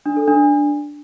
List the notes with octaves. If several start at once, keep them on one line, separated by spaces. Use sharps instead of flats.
D4
A4
D4